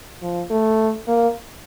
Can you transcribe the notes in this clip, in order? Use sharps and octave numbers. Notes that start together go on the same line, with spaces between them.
F3
A3
A#3